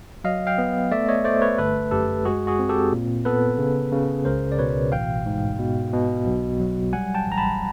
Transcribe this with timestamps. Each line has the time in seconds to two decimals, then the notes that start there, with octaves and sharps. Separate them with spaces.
0.24 F#3 D#5 F5
0.47 F5 G5
0.58 B3
0.91 A3 D5 E5
1.08 C#5 D#5
1.24 A3 C5 D5
1.42 B4 C#5
1.58 G1 A4 B4
1.91 F#2 G4 A4
2.25 G#3 F#4 G#4
2.47 F#4 G#4
2.59 C4
2.69 G4 A4
2.92 A#2
3.25 B3 A4 B4
3.58 C#3
3.92 C#3
4.25 C#2 A#4 C5
4.52 D5
4.59 B2 B4 C#5
4.92 A1 F5 G5
5.26 G#2
5.59 B2
5.93 B2
6.26 B1
6.60 F#3
6.93 G3 F#5 G#5
7.15 G5 A5
7.27 A1 A#5
7.38 A5 B5